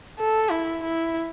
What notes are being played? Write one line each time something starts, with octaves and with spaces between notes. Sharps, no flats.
A4
E4
E4